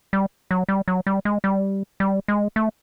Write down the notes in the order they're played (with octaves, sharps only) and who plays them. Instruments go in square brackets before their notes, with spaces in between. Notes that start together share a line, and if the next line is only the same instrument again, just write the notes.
[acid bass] G3
F#3
G3
F#3
G3
G#3
G3
G3
G#3
A3